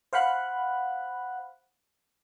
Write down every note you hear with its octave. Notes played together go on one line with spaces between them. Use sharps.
C5 F5 F#5 B5 F#6